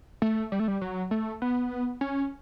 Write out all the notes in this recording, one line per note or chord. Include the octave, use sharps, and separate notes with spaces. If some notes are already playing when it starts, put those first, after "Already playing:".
A3
G3
A3
G3
F#3
A3
B3
C#4